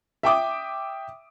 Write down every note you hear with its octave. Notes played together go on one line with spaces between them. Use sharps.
E5 G5 D6 D#6